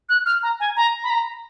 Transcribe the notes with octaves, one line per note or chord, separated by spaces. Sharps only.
F#6
F6
A#5
G#5
A#5
B5
A#5